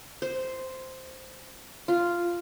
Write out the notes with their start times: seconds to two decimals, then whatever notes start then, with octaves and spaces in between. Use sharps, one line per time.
0.22 C5
1.88 F4